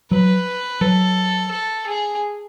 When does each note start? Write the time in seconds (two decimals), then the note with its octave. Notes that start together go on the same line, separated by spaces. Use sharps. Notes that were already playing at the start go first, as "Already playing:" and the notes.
0.11 F#3 B4
0.81 F#3 A4
1.51 A4
1.86 G#4